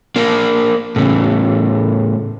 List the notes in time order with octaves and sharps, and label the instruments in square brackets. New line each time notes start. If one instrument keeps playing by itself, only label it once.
[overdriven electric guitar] A#3 D4
A2 C#3